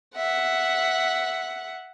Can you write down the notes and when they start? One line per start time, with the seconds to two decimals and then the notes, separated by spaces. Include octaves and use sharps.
0.16 E5 F#5